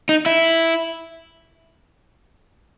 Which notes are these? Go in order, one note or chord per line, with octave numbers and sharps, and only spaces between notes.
D#4
E4